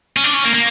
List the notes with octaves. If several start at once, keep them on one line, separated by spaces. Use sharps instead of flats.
C#4
D4
C#4
A#3
A#3